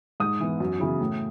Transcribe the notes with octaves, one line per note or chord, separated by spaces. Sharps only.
G#2 D#6
E3 B3
F#2
C#3 E3 B3
A2